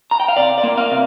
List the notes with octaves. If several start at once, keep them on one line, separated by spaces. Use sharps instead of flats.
A#5
G5
F5
C3 D5
D5
A#3
F5
C3